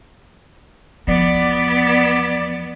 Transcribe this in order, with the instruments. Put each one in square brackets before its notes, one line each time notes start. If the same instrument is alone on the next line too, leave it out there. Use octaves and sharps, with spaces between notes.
[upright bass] E2 F3 [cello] B3 [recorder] D5